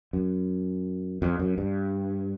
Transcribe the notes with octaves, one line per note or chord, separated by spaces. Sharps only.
F#2
F2
F#2
G2